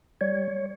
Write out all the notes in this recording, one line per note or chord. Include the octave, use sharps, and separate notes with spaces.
G3 C#5